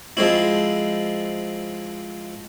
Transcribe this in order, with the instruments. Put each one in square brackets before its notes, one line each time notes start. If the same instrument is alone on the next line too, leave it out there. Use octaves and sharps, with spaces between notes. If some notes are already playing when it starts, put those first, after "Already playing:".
[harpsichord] F3 G#3 C4 E4